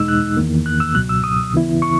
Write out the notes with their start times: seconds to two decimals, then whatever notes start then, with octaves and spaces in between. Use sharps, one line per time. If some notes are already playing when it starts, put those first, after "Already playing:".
Already playing: E2 B2 G#3 D#4 E6
0.08 F#6
0.37 E2 D#3 A#3
0.66 F#6
0.80 E6
0.94 C#2 B2 F#3 F#6
1.09 E6
1.24 D#6
1.53 D#2 C#3 E3 B3 E4
1.82 C#6